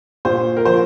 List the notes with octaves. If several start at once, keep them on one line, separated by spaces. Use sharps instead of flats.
A#2 C5
A#4
F3 C5